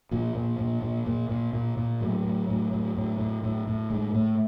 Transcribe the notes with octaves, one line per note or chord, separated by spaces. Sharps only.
A#2 F3
A#2
A#2
A#2
A#2
A#2
A#2
A#2
A2 F#3
A2
A2
A2
A2
A2
A2
A2
A2 G#3
A2 A3